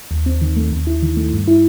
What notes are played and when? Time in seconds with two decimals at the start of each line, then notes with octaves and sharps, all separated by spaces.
0.11 D#2
0.26 C4
0.41 D#3
0.56 A3
0.72 D#2
0.87 E4
1.03 D#3
1.17 A3
1.33 G2
1.48 E4